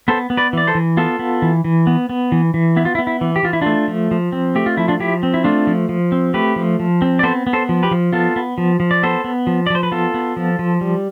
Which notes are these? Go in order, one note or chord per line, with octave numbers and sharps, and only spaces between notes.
B3 A4 C5
B3
B4 D5
E3 D5
A4 C5
E3
B3 F4 A4
B3
E3
E3
B3
B3
E3
E3
B3 E4
F4
E4
B3
E4
E3
G4
E3 F4
E4
A3 D4 F4
F3
F3
C4
A3 G4
F4
F3 E4
D4 F4
F3 E4 G4
C4
E4
A3 D4 F4
F3
F3
C4
A3 G4 B4
F3
F3
C4
D5
B3 A4 C5
B3
A4 C5
F3
G4 B4
F3
B3 F4 A4
B3
F3
F3
D5
B3 A4 C5
B3
F3
D5
F3 C5
B4
B3 F4 A4
B3
F3
F3
G3